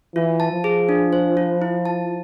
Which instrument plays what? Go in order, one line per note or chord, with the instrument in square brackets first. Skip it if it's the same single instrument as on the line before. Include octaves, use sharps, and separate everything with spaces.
[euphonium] E3 [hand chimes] F4
[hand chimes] A5
[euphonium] F3
[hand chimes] G#4
D4
C5
F4
E4
A5